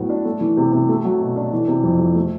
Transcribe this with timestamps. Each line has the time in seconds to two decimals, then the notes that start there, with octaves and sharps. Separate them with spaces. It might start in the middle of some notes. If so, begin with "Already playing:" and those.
Already playing: A2 F#3 B3
0.09 D4
0.25 A3
0.41 E3
0.57 C3
0.73 C3
0.89 A3
1.05 F#3
1.21 B2
1.36 D4
1.52 E3
1.68 C3
1.83 F2
1.99 F2
2.15 A3